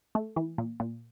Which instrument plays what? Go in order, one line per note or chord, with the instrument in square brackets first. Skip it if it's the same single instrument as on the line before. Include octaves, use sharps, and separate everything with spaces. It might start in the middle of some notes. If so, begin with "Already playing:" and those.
[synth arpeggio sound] A3
E3
A#2
A#2